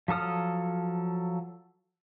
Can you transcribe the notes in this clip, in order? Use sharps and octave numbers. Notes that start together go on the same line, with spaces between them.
F3 F#3 A4 D#6 F6